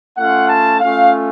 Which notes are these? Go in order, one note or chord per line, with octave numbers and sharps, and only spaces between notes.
A3 C#4 F4 F#5
A5
A3 C#4 F4 F5